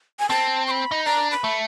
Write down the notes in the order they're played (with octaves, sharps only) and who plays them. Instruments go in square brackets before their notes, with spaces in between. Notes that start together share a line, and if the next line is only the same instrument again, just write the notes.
[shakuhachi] G#5
[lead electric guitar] C4 [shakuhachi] A5
[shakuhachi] C#6
B5
[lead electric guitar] D#4
[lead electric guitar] D4 [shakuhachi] A#5
[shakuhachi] B5
[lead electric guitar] A3